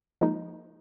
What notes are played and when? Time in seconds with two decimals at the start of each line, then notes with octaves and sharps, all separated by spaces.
0.21 F3 G#3 A#3 D#4